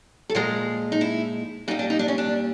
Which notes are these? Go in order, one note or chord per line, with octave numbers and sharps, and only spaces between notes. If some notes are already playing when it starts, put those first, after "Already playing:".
A4
A#2 F3 G#3 A#4
D#4
E4
A#2 G3 D#4
D4
D#4
D4
C#4
D4